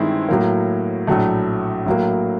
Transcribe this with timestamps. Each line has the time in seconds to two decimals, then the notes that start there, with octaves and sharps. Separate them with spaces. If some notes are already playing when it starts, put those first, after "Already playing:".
Already playing: G2 D#3 G#3 C4 E4
0.29 A2 F#3 A#3
1.07 A#1 A2 F#3 A3
1.86 A2 F#3 A#3